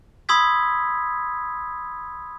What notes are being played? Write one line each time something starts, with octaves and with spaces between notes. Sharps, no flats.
B5 C6 D#6 E6 G#6 B6